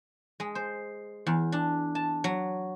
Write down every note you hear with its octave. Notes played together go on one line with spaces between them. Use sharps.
G#3
C5
E2
D4
A5
F#3